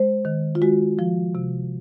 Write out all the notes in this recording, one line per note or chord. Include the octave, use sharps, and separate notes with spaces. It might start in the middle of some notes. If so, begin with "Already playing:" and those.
Already playing: G#3 C5
D#3
F4
G#3 F#4
F3
C3